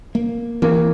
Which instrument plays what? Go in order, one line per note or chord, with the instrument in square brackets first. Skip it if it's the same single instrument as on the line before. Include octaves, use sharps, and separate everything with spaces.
[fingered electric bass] A#3
[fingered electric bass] E3 [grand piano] A#3